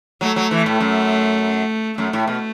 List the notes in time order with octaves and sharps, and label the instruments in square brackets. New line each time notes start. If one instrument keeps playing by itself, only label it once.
[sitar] F#3 [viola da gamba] A3
[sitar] F#3
E3
A2
F#2
[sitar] F#2 [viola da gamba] A3
[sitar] A2
B2